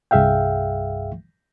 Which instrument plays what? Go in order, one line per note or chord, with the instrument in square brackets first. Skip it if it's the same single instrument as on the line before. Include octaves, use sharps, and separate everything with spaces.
[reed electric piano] C2 G2 G#4 E5 F5 G5